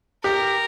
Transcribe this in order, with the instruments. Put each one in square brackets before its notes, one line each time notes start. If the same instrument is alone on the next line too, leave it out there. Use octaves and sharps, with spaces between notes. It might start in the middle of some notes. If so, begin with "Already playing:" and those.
[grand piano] G4 [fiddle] A#4